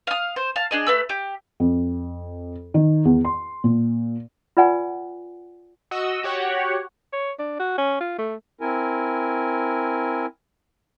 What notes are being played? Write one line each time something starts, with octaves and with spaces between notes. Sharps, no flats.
F5 D#6
C5
F5 A5
D4 G#4 D#5
A3 B4 E6
G4
F2
D#3
E2
C6
A#2
F4 B4 D5 F#5 G#5
F#4 D#5 E6
F#4 G4 C#5 F#5
C#5
D4
F#4
C#4
F4
A3
C4 E4 A#4 G#5